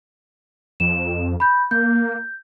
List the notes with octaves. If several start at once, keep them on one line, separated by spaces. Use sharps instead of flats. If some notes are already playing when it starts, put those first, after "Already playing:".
F2 E7
B5 G6
A#3 G6